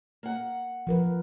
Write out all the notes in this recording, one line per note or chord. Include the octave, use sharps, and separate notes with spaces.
A#3 F#5
F3 A#4 B4